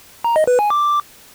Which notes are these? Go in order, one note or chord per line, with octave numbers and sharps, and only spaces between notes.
A#5
D#5
B4
G#5
D6